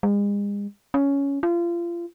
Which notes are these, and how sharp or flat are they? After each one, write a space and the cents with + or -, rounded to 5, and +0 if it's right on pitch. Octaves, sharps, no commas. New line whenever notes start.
G#3 -40
C#4 +10
F4 -30